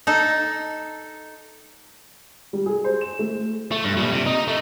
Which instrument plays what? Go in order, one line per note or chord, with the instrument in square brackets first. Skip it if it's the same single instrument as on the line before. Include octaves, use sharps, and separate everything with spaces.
[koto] D#4 A4
[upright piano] G3
G#4
C5
E7
A3
[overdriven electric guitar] A3
G2
A#2 G3
C3
D#4
A3